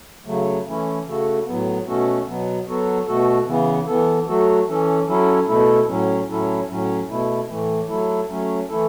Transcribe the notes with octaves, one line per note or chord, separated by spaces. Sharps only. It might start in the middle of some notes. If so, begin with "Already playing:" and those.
C#3 F#3 A3
E3 A3 C#4 E4
C#3 A3 F#4 A4
A2 F#3 B3
B2 A3 C#4 F#4 A4
B2 F#3 B3
F#3 B3 F#4 A4
B2 A3 F#4 A4
C#3 E3 B3
E3 B3 A4
F#3 A3 F#4 A4
E3 C#4 A4
F#3 C#4 E4 A4
B2 A3 E4 A4
A2 F#3 C#4
A2 F#3 C#4 E4 A4
A2 F#3 C#4
B2 A3 E4
A2 E3 A3
F#3 A3 E4 A4
F#3 A3 C#4
E3 A3 E4 A4